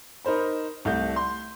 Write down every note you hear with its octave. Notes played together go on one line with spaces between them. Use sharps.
D#4 A#4 C5 B5
C2 A3 G6
C6